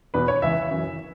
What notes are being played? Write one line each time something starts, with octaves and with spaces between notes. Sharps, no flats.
E2 B2 B4
C#5
C#2 C#3 E3 E5
F#2 E3